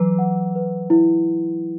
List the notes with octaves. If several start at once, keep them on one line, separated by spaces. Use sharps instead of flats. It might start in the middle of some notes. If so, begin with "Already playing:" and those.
Already playing: E3 F#3 B4
F#5
B4
E4